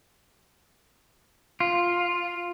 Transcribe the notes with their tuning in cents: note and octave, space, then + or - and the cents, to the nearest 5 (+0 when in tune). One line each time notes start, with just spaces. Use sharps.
F4 +5